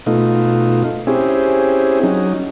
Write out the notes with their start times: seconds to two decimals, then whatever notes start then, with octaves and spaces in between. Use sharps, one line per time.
0.06 B2 A3 D#4 F4
1.07 C4 C#4 E4 G4 G#4
2.03 F#3 C#4 D#4